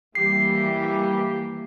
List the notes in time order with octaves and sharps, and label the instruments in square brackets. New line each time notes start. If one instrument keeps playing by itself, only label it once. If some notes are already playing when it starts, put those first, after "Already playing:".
[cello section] E3 G3 A#3 [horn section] G4 [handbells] C7